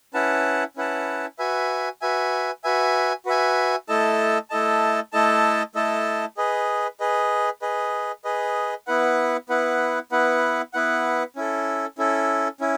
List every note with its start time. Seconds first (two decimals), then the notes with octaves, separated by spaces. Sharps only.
0.14 C#4 E4 B4 F#5 A5
0.76 C#4 E4 B4 F#5 A5
1.39 F#4 B4 E5 G#5
2.02 F#4 B4 E5 G#5
2.64 F#4 B4 E5 G#5
3.26 F#4 B4 E5 G#5
3.89 A3 E4 A4 D#5 A5
4.50 A3 E4 A4 D#5 A5
5.13 A3 E4 A4 D#5 A5
5.75 A3 E4 A4 D#5 A5
6.37 G#4 B4 D#5
7.00 G#4 B4 D#5
7.62 G#4 B4 D#5
8.24 G#4 B4 D#5
8.87 B3 E4 B4 F#5
9.49 B3 E4 B4 F#5
10.12 B3 E4 B4 F#5
10.74 B3 E4 B4 F#5
11.36 C#4 E4 A4
11.98 C#4 E4 A4
12.60 C#4 E4